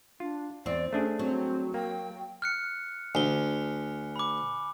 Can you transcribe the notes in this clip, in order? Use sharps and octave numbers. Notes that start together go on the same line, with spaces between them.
D4 F4
E2 C4 D5
A3 C#4 D4 G#4
F#3 C4
A#3 G5
F6 F#6 C#7
D2 G#5 G7
B5 D6